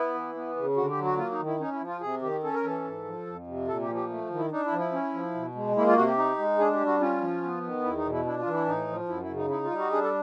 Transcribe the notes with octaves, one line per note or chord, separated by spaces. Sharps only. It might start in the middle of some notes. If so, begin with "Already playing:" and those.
Already playing: B3 E4
E3
B3
C#3
D3 F#4
G4
F#3
F#4
A#3 F4
D#4
D#3
E4
C#4 D#4
E4
F3
F4
C3 G#4
D#3 G4
C#4 A4
A#4
E3 A4
G#2
F3
F2
C3
A#2 A4
G4
F3
G4
A3
D#3
E4
D4 D#4
E4
F3
E4
C#4
F3
B2
G#3
A#3 E4
F4
C3 F#4
G4
D#4
G#3
D4 G#4
G4
G3
F#4
C#4 F4
F3
B3
D#3
E2 E4
D#4
B2
E4
D4 E4
F4
E3
E4
A2 D#4
F3
F#2 E4
E4
C#3
D#4
D#4 E4
F4
G3
F#4
D4 G#4
A4